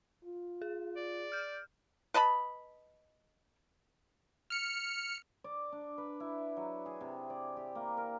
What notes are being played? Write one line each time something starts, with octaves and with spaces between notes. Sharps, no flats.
F4
G#4
D5
F6 G6
B4 D#5 A5 B5
F6 C#7
D5
D4
B4
E4
F#3
G#4
C3
D5
G4
A#3
A#4